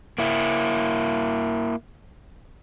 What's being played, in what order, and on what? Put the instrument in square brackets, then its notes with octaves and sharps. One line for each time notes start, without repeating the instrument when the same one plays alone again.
[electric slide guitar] A#3 E4